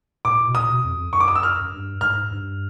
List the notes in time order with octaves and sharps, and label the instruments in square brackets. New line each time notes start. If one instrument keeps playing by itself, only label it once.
[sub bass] A2 [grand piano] D6
[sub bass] A2
B2
[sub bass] A#2 [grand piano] D#6
[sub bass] B2
F2
F2
[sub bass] F#2 [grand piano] C#6
[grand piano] D6
D#6
E6
F6
[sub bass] F#2
G2
[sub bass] G#2 [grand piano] F6
[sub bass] G2